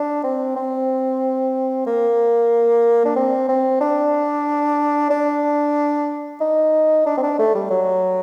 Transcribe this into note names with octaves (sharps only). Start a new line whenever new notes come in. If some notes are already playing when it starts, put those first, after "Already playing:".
Already playing: D4
C4
C4
A#3
D4
C4
C4
D4
D4
D#4
D4
C4
D4
A3
G3
F#3